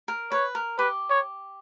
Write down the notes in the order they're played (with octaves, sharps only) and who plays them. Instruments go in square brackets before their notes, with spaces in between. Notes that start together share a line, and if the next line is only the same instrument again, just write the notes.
[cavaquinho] A#4
[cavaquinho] B4 [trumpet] C#5
[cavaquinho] A#4
[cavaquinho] G4 [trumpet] B4
[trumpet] C#5